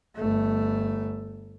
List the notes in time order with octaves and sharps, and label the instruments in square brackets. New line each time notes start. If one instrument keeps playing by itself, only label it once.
[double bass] G1 A3